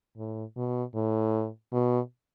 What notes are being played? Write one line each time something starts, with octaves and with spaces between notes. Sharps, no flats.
A2
B2
A2
B2